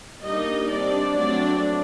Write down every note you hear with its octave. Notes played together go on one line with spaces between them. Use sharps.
G3 A#3 D4 D#4 D#5
G3 C4 D4 D5
F#3 A3 C4 D4 D5